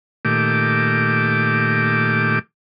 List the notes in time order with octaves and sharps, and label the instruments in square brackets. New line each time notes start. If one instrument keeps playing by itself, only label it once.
[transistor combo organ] A#2 D#3 A3 G4 D6